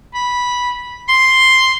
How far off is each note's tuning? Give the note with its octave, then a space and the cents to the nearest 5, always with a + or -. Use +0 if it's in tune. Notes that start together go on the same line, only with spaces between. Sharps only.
B5 -10
C6 +0